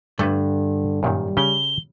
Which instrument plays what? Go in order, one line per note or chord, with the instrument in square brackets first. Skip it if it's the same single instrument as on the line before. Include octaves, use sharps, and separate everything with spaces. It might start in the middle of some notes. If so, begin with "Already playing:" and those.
[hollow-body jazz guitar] G2 [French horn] D3 [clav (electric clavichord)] A3 A4 B4
[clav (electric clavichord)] F#2 A#2 D#3 [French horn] G3
[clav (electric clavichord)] C#3 C#4 G4 [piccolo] G7